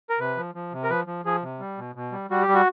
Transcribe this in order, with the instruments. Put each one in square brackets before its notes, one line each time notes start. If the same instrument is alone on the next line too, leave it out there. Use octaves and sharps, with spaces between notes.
[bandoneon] A#4
C3 B4
F3
F3
C3
A#4
F3 B4
F3
F3 G#4
C3
G3
B2
B2
G3
G3 F#4
G4
G3
F#4